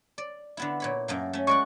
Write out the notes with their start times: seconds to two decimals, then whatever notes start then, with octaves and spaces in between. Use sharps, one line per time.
0.18 D5
0.57 D3 B3 E4
0.80 A#2 C#5 B5
1.08 F#2 A3 A#3
1.33 A3 C#4
1.47 G#3 D5 F#5 C#6